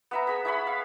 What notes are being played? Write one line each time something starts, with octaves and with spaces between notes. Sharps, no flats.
B3 E5 A#5
G#4 B5
E4 C#5 B5
F5